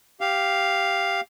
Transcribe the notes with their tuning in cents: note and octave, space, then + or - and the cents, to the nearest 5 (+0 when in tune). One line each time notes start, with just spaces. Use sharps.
G4 +0 F5 +0